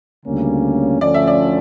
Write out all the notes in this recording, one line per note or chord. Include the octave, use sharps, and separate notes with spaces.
D2 C#3 G3 A#3 C#4
D2 D3 F3 A3 C#4 D5
E5
D5